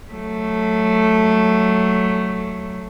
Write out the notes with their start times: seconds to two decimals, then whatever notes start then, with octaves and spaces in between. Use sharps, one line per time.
0.12 F#3 A3